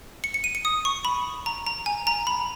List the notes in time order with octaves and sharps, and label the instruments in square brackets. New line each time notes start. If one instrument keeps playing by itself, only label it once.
[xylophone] C#7
C#7
D#7
C#7
D#6
C#6
B5
A#5
A#5
G#5
A#5
B5